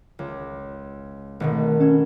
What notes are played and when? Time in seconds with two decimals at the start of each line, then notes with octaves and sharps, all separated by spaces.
0.19 C#2
1.40 G#1 B2 D#3 A3
1.80 C#4 A4 G#6